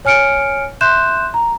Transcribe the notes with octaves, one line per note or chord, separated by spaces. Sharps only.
C#5 G#5 F6 C#7 D7
E5 C6 F#6 G6 E7
A#5